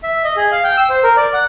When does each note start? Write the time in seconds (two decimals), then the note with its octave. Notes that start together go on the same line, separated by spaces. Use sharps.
0.03 E5
0.24 D#5
0.37 G#4
0.52 F5
0.64 G5
0.77 E6
0.89 C5
1.03 A#4
1.17 D5
1.34 F#5